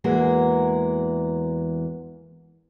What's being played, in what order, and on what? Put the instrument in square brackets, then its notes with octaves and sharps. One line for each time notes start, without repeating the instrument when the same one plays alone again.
[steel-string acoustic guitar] E2 E3 G#3 A#3 F#4 A#4